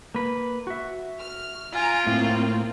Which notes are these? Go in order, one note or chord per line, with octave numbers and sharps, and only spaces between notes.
A#3 B4
F#4 E5
F6
F4 G#5 A#5 D7
A2 A#3 C4